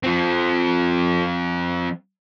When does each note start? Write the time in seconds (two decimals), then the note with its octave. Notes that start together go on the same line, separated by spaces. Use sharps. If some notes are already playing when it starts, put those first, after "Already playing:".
0.03 F3 C4